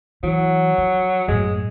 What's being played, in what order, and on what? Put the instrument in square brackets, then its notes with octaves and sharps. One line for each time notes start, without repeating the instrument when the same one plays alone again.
[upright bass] E3 [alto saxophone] F#3
[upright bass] F3
[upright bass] F#2 A2 [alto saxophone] G#3